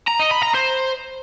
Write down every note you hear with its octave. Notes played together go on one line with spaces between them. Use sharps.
A#5
D#5
B5
A#5
C5